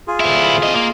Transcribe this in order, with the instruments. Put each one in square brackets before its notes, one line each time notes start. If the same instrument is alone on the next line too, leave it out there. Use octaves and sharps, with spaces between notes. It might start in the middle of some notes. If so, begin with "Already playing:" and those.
[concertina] F4 G#4
[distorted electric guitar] D2 E4
C3 D#5
A#3